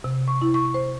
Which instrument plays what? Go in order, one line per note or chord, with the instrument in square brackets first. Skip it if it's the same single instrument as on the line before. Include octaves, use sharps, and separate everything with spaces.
[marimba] C3
C#6
E4
C#6
C5